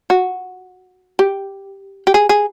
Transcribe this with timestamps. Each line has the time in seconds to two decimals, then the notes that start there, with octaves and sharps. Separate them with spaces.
0.10 F#4
1.19 G4
2.07 G4
2.14 G#4
2.29 G#4